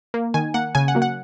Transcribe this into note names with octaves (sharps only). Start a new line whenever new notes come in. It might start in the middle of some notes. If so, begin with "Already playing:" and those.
A#3
D#3 G#5
A#3 F#5
C#3 G#5
F#5
F#3 A#3
F#5